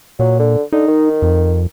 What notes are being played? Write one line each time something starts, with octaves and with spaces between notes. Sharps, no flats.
A#2 F#3
D3
D3 D#4
D#3
F2